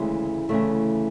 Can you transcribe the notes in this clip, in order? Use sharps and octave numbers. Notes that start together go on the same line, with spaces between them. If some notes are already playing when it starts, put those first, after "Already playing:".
Already playing: D2 C#3 E3 G#3
D2 C#3 E3 A3